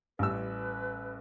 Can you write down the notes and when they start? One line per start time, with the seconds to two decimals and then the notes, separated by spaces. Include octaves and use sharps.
0.19 A1 G3 B4 E6